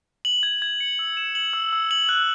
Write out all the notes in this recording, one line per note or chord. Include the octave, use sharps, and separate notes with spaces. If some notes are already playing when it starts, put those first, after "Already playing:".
F#7
G#6
G#6
C#7
E6
E7
F#7
E6
E6
F#7
F#6